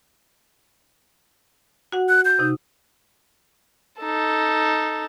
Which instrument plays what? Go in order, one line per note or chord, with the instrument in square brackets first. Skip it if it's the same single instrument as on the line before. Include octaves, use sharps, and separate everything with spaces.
[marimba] F#4 F#5
[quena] F#6
G6
[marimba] C3 D#4
[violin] D#4 A4